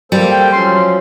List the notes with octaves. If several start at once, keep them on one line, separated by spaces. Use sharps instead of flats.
G3 A#3 A4 C5
G5
F3 F#3 C#4 C6